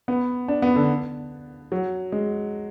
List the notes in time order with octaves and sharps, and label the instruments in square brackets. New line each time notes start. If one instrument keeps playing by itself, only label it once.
[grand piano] B3
D4
B3
D3
F#3
G#3